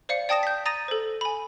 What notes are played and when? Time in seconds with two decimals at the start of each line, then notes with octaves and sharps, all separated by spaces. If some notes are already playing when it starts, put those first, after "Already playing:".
0.09 C5 D5 F5 C#7
0.29 D5 G5 A5 D#6 A#6 E7
0.43 G6 B6
0.66 A#5 D#6 A6 A#6 D#7
0.88 A4 C5
1.21 G#5 B5